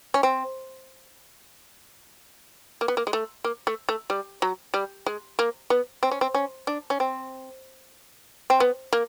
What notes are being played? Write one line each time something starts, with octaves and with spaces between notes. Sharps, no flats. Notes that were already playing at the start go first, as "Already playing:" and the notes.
C#4
C4
A#3
B3
A#3
G#3
A3
A#3
A3
A3
G3
F#3
G3
G#3
A#3
B3
C4
C#4
C4
C#4
D4
C#4
C4
C4
B3
A#3